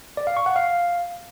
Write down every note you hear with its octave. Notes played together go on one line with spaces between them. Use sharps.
D5
F5
C#6
F#5
F5